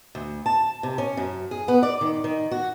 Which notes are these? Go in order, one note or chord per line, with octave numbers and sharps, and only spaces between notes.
D2
A5
C3
C#4
F#2
G#4
B3
D5
D#3
D#3
F#4